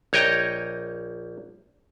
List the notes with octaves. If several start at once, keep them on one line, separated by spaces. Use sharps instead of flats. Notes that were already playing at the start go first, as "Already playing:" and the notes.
A#1 C#5 D#5 G5 A#5